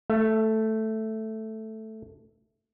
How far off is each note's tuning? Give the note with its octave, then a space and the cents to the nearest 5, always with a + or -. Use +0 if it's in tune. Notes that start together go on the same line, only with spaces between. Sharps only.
A3 +0 E5 +40